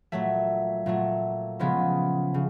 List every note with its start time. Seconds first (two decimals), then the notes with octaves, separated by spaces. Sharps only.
0.12 A#2 F#3 A3 E5
0.86 A#2 F#3 A3
1.59 C#3 F3 G#3 B3
2.34 C#3